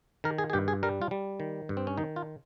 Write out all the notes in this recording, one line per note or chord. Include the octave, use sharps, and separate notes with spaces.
D#3 A#4
G#4
G#4
G2 G4
G#4
G3 A#4
F4
G3
D#3
G2
C4
C#4
D#3 D#4
F4